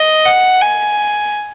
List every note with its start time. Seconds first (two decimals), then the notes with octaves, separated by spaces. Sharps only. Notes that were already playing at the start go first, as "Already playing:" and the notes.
Already playing: D#5
0.25 F#5
0.61 G#5